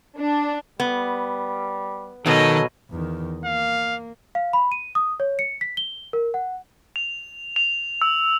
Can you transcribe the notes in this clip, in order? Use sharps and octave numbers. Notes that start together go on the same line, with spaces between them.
D4
G3 B3
B2 D#3 F#3 A4 D#5 G#5
E2 D#3
A#3 F5
F5
B5
D#7
D#6
C#5
C#7
B6
G7
A#4
F#5
F7
F7
E6